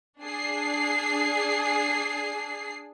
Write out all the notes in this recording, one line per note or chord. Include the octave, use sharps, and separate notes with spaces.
D4 G#4 C7